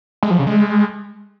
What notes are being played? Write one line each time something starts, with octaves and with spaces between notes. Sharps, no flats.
G#3
F3
C#3
G#3